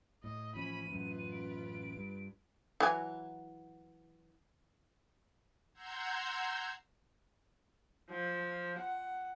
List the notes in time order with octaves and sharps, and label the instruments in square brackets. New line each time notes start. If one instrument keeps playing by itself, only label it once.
[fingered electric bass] A2 [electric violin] D#5
[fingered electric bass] A1 F3 [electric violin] C#4 B5 [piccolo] D#7
[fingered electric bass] A1 F#2 [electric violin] F4 B4
[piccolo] D7
[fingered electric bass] G2
[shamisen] E3 F#3 G#5
[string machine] F#5 A#5 C6 E6 G6 G#6
[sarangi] F3
F#5